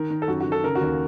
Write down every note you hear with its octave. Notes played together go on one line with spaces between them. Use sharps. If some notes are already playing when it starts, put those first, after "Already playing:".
Already playing: D#3 A#4
D#3
A4
F#2 F#4
D#3 F#4
A4
C#3 A#4
F#4
D#2